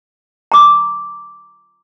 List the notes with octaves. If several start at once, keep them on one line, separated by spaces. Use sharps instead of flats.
A#5 D6